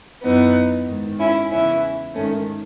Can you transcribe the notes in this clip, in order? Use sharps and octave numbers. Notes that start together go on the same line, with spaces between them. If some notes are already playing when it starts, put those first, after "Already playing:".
F#2 E3 B3 D#4
G#2 D#3
C#4 E4
E2 C#3 E3 C#4 E4
G#2 D#3 A3 C#4